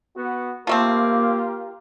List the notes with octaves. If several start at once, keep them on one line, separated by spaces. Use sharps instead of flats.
B3 F#4
F3 A3 A#3 C4 F4 G4 A#4